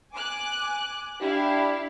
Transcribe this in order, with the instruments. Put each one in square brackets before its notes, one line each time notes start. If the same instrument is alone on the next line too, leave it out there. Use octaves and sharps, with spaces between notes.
[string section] G#5 D6 F#6
[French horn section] D4 G4 [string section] E4 F5